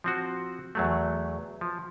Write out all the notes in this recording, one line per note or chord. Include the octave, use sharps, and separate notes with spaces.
F3 C4 F#4
E2 F#3 A3
F3